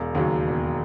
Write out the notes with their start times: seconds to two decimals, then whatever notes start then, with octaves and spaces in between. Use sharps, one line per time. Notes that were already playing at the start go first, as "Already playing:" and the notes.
Already playing: E1
0.15 D#2 C#3 F#3
0.47 E1